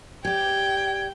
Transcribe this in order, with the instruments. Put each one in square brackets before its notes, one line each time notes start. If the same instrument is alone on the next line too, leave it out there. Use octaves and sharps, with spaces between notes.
[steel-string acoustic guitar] G4 D5 [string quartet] G5 [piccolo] G#6